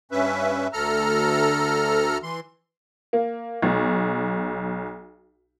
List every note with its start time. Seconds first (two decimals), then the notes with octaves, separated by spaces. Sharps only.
0.12 G2 C#4 B4 E5
0.73 D2 A4 A#5 F6
2.23 E3 C6
3.13 A#3
3.62 B1